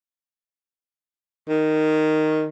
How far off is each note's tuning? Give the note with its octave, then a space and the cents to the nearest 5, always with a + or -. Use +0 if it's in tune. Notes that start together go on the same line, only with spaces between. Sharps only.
D#3 -5